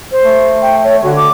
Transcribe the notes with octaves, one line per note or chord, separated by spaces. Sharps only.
C5
A3
G5
C#5
D3 F#4
D6